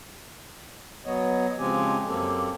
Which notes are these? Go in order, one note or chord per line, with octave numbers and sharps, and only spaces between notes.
F#3 B3 C#5 D#5
C#3 F3 G#3 C4 G4 G#5
F#2 A#3 C4 G4 A4